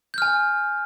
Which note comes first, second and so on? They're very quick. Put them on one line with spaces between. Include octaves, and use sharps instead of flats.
G6 F6 G#5